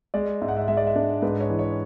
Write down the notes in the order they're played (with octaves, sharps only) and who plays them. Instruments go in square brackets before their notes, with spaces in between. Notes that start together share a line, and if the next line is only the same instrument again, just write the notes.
[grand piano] G#3 D5
G#2 E5
F#5
E5
G#3 E5
D5
E5
D4
G#2 B4
C#5
E3
C#5